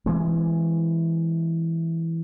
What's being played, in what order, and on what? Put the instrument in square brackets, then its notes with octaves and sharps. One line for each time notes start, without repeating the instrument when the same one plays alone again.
[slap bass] E3 G#3 C4